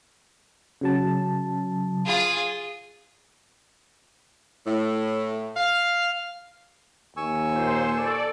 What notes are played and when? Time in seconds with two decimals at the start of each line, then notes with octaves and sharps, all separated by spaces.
0.81 C#3 F#3 A5
2.05 F4 G#4
4.66 A2
5.57 F5
7.17 D#2 G#5 C#6 E6
7.51 A#2 C5
7.91 A4 D5